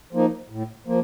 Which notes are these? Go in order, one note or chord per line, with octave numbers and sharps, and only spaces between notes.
F3 A#3 D#4
A2
F3 A#3